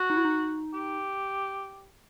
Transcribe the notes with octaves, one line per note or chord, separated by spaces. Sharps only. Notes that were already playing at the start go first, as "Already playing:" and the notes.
Already playing: F#4
D#4
E4
D#4
G4